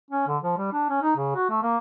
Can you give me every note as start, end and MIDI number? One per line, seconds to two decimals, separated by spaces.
0.11 0.26 61
0.28 0.37 50
0.43 0.55 53
0.58 0.70 55
0.73 0.88 62
0.90 0.97 61
1.02 1.13 63
1.17 1.31 49
1.35 1.48 66
1.49 1.59 57
1.63 1.77 58